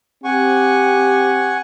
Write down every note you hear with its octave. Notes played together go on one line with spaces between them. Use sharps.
C4 G4 F#5 G#5 C#6